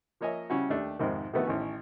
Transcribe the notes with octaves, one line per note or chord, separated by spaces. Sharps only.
F3 A#3 C#5 D#5 E5 G#5
C#3 G3 C#4 E4 F#4
D#2 A3 D4 G4
F2 G#2 C3 D#3
C3 D#3 E3 A3 B3 F#4
A1 D#3 C#4